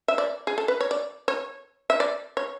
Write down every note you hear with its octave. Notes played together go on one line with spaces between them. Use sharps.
E5
D5
G#4
A4
B4
C#5
D5
C#5
E5
D5
C#5